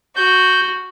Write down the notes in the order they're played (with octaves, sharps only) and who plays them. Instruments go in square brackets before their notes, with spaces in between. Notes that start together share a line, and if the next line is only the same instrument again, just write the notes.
[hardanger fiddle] F#4 [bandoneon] G6